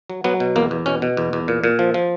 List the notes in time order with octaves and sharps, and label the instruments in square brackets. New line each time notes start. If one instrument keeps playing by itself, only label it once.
[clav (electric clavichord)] F#3
F#3 B3
B2
E2 A#3
E2
B2 C#4
B2
E2
E2
A#2
A#2
F3
F3